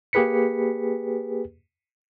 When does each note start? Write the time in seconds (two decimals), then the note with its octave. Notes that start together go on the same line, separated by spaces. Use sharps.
0.13 A#3 G4 G#4 B4 B6 C#7